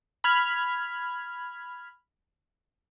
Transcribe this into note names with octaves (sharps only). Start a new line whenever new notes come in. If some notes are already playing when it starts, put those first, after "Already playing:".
B5 F6 G#6